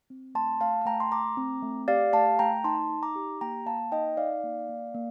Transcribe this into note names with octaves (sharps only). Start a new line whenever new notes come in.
C4
A3 A5 C6
A3 F5 A5
A5
A3 G5 A#5
C6
A3 A#5 D6
C4
A3
G4 D5 F5
A3 F5 A5
A3 G5 A#5
D#4 A5 C6
D#4
A#5 D6
G4
A#3 G5 A#5
A#3 F5 A5
D#4 D#5 G5
D#4 D5 F5
A#3
A#3
A#3